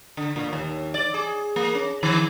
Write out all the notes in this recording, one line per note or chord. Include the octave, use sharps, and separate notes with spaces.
D3
A#2
D#2
D5
G#4
A#3
C#4
D#3